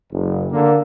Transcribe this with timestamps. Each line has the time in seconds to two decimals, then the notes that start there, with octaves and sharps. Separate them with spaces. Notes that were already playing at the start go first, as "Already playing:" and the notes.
0.12 F#1
0.51 D3 A#3